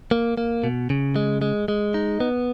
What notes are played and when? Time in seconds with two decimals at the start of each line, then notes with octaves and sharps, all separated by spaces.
0.11 A#3
0.37 A#3
0.64 B2
0.90 C#3
1.16 G#3
1.42 G#3
1.68 G#3
1.94 D#4
2.20 B3